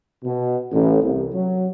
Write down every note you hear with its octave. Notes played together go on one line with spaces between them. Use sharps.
B2
A1
C2
F#3